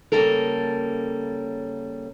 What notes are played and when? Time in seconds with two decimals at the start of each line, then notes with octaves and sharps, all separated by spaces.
0.12 C#3 G3 A#3 A4 A#4